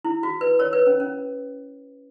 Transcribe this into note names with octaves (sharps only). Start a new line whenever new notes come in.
E4
F#4
B4
A#4 C#5
B4
C#4
C#4